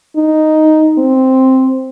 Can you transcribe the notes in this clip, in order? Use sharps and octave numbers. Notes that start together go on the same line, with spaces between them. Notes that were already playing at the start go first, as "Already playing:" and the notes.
D#4
C4